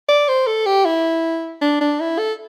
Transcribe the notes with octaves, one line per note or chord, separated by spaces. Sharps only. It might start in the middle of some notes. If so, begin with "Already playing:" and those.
D5
C5
A4
G4
E4
D4
D4
E4
A4